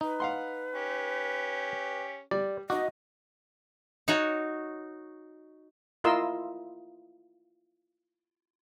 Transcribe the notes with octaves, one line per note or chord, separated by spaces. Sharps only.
D#4 B4
F5 F#5 C6
C#4 G4
G3 D5
D#4 F#4 D#5 D6
D#4 F#4 C#5
E4 F4 A#4 D#5 C6 E6